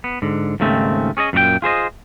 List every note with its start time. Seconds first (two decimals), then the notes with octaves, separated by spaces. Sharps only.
0.04 B3
0.22 G#2 D3
0.60 D#2 G#2 C#3 A3 C4
1.17 C#4 G#4 C#5 D#5
1.33 F#2 A#2 F#4 G5
1.62 F4 G#4 C5 D#5